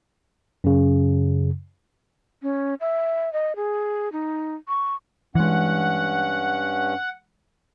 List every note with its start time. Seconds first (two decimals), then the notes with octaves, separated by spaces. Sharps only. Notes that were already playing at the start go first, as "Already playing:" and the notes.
0.64 F#2 C#3
2.42 C#4
2.80 E5
3.33 D#5
3.56 G#4
4.12 D#4
4.68 C#6
5.35 G2 E3 G#3 C#4 F#5